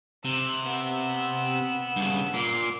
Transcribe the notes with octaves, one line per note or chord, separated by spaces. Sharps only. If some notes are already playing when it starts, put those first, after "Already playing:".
C3 E6 F#6
B3 E6
G2 C#3
A#2 D6 C7